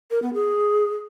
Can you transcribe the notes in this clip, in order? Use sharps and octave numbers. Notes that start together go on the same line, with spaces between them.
A#4
B3
G#4